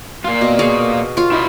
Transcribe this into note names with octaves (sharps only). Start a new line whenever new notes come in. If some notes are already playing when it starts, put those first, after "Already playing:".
A#2 F4
B2
G#4 C#5 F5
F4 C#5
E4 D#5 E5